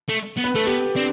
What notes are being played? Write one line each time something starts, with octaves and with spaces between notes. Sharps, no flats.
A3
B3
B4
A3 A4
B3 G4
C4 D4